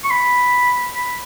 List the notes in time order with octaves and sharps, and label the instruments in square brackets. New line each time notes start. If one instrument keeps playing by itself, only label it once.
[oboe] C#6
B5
B5